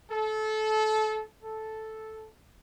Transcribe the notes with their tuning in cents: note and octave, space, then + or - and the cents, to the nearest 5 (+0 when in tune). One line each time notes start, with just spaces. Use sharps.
A4 -25
A4 -5